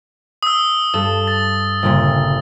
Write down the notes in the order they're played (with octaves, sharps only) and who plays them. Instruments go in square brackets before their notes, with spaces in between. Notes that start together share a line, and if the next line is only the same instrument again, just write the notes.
[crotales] D#6 E6
[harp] G2 A4 E7
[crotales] A6
[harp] G1 A#2 C#3